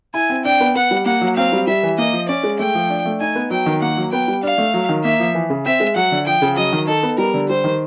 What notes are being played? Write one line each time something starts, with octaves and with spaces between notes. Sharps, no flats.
E4 G#5
C4
D4 G5
B3
B3 F#5
G3
A#3 F#5
F#3
C4 F5
G3
G3 E5
E3
A#3 D#5
F3
C#4 D5
G#3
A3 G5
F3
D4
A3
D#4 G#5
B3
F#3 G5
D#3
A#3 F#5
F#3
B3 G5
G3
D4 F5
A3
F#3
D#3
A#3 E5
F3
E3
C#3
C4 E5
G#3
F#3 F#5
D3
F3 G5
C#3
F#3 D#5
D#3
D#4 A4
B3
G3 A#4
D3
G3 C5
D#3